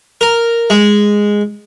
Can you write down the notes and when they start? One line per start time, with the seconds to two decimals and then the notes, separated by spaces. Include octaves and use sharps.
0.21 A#4
0.70 G#3